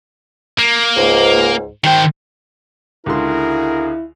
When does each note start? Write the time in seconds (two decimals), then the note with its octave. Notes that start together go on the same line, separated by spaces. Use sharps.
0.59 A#3
0.96 C#2 G#2
1.84 D#3 C5 G5
3.06 C#2 D3 E4 F#4 G#4 A#4 C6